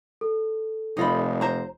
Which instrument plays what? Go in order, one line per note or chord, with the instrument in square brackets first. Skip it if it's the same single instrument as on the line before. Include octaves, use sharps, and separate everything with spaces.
[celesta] A4
[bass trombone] F1 [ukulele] D#4 F4 B5
[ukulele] C5 A#5